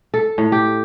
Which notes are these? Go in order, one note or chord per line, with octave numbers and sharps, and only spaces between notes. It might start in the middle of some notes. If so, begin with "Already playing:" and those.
A4
A2
G4